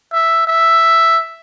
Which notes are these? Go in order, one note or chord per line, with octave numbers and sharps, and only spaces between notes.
E5
E5